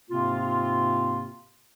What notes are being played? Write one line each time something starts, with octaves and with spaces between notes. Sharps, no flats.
G#2 C3 A#3 C4 F4